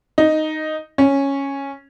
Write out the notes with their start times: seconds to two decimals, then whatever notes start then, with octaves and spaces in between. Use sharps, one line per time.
0.18 D#4
0.98 C#4